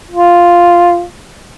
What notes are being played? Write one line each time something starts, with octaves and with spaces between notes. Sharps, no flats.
F4